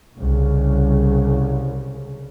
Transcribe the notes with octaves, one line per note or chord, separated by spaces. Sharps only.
C2 C#3